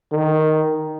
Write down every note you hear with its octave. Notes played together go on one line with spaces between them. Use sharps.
D#3